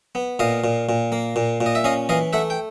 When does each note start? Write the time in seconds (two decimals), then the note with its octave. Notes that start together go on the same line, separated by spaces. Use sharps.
0.15 B3
0.39 A#2 D#5 F5
0.64 A#2
0.89 A#2
1.12 A#3
1.36 A#2
1.61 A#2
1.66 D#5
1.75 E5
1.84 C#4 D#5 F5
2.09 E3 D#5 F5
2.33 A3 E5 F#5
2.50 G5